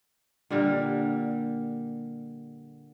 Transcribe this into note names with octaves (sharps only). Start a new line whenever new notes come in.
A#2 D3 G3 A#4